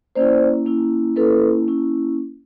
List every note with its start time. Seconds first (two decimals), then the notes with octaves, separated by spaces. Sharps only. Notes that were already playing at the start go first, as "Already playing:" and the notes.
0.16 A#3 C#4 E4 C5 D5
0.66 A#3 C#4 E4
1.16 A#3 C#4 E4 A4 B4
1.67 A#3 C#4 E4